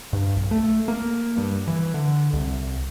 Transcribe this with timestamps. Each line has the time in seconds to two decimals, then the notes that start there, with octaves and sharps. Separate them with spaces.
0.13 G2
0.36 B1
0.51 A3
0.88 A#3
1.38 G2
1.68 E3
1.94 D3
2.33 C2